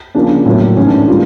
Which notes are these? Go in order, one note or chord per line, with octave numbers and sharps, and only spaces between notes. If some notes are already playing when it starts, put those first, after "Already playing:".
C#3 F3 A#3 D4
A2 F#3 A#3
G#2 E3 A3 C#4
D4
C#3 E3 G3 A#3 F4